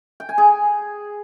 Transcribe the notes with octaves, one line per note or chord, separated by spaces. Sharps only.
G5
G#5
G#4